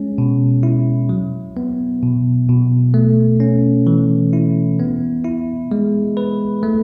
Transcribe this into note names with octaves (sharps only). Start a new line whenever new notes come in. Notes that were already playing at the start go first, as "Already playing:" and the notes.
Already playing: G#3 C#4
B2
E4
F#3
B3
B2
B2
A3
C#4
E3
E4
B3
E4
G#3
B4
A3